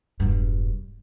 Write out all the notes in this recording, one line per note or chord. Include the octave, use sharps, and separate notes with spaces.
E1 G2